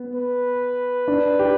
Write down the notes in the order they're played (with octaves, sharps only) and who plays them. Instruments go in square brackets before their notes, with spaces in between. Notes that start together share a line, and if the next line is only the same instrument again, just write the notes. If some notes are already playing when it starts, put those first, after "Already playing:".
Already playing: [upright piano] B3
[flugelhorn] B4
[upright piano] D4
G4